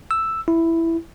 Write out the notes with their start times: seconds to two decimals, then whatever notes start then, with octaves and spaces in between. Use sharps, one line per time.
0.11 E6
0.48 E4